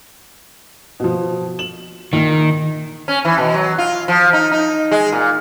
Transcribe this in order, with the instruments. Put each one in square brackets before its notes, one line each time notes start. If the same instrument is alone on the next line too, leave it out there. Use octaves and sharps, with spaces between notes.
[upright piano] B2 F3
E7 F#7
[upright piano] A#1 [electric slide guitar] D#3
[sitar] C#4
E3
B2
F#3
F4
F3
D#4
D#4
G#3
A#2